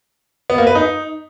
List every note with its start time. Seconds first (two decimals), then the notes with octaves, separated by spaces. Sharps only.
0.50 B3
0.58 A#3
0.67 B4
0.75 D#4